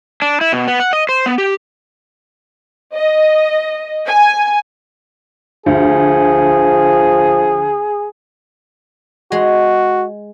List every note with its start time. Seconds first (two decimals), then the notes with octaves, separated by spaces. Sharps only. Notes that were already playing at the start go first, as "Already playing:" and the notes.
0.22 D4
0.41 E4
0.52 B2
0.68 B3
0.80 F#5
0.93 D#5
1.09 C5
1.26 B3
1.38 G4
2.95 D#5
4.07 G#5
5.66 D2 F3 G#4
9.32 G#3 F#4